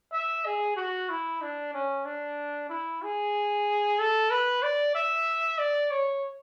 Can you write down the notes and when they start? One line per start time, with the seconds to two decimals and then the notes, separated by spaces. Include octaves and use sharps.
0.13 E5
0.46 G#4
0.76 F#4
1.10 E4
1.41 D4
1.73 C#4
2.05 D4
2.69 E4
3.02 G#4
3.99 A4
4.30 B4
4.62 D5
4.95 E5
5.58 D5
5.90 C#5